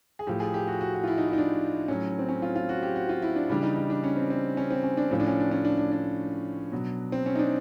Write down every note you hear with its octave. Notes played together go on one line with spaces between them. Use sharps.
G#4
A2 F3 G4
G#4
G4
F#4
F#4
F#4
F4
E4
D#4
E4
D#4
D4
A2 F#3 C#4
C4
C#4
F4
F4
F#4
G4
F#4
F4
E4
D4
C#3 E3 G3 D4
D#4
D#4
D4
C#4
C4
C4
C#4
C4
C#4
D4
A2 F3 C#4
D4
C#4
D4
C#4
D4
D4
D4
B2 F#3
C4
C#4
D#4
D4